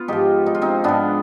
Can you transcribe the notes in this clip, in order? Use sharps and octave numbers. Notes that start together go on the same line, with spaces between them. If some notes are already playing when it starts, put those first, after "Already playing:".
Already playing: B3 F4
G#2 F3 D#4 G4
D#4
F4
C4 D#4
G#2 F3 B3 D4